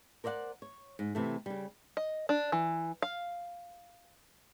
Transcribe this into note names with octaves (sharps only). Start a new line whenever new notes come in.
A#4 C5 D5 E5 F#5
C#5
G#2
C3 E3 A3
C#3 G3
D#5
D4
E3
F5